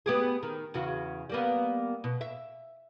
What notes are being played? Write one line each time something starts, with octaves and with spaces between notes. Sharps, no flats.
B3 G4 G#4
D#3
E2 C#3 F#4
G3 A#3 B3
B2
E5